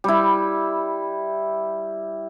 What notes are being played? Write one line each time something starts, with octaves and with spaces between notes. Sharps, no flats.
G3 E4